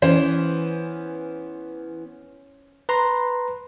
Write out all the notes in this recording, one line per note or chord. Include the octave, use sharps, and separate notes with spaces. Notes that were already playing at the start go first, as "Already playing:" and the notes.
E3 B3 C#4 C5
B4 A#5 C6